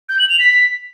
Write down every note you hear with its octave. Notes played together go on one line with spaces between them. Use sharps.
G6
F#7
F7
B6